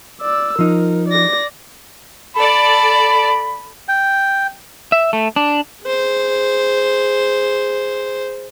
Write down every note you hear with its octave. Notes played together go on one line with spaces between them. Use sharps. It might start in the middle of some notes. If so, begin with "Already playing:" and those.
D5 E6
F3 D#4 A#4
D5 A#6
A4 D5 B5
G5
E5
A3
D4
G#4 C5